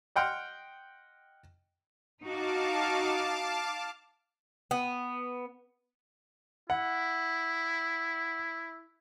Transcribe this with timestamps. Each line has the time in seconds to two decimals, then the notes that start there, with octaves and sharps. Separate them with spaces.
0.16 D#5 F#5 G5 C6 F6
2.23 D#4 F#4 F5 A5 D6
4.71 B3
6.70 E4 F#5